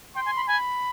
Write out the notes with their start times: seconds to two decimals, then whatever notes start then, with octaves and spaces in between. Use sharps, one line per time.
0.15 G5 C6
0.26 G#5
0.36 B5
0.47 G#5 B5